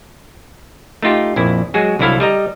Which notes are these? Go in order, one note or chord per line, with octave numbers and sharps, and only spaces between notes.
A3 D#4 F4 G4
A#1 F2 E4
F#3 G#3 F#4 G#4
C2 D3 F#3 E4 A4 F5
G3 D#5 A#5